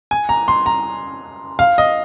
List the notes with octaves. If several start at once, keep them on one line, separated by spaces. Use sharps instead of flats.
G#5
A#5
C6
A#5
F5
D#5